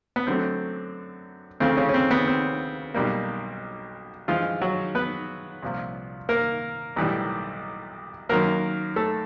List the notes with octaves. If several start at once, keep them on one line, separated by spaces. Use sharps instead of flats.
B3
F#2 D3 F#3 A3 C4
D2 C#3 F3 A3 C4
C#3 C#4
C#4
C4
B3
C4
B1 B2 G3 A#3
G2 E3 F3 G#3 F4
F#3 F#4
B3 B4
C2 A#2 F3
A#3 A#4
B1 A2 E3 G3
F#2 D#3 F#3 A#3 A#4
A3 A4